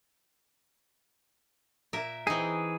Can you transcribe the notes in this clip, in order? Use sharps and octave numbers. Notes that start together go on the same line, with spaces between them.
A#2 A#4 E5
E3 C4 D#4 G#4